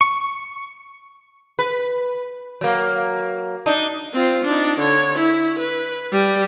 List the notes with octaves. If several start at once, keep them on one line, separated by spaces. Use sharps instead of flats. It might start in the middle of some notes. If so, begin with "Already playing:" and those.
C#6
B4
F#3 A#3
D4 D#4
C4 F4
D4 D#4
D3 C#5
E4
B4
G3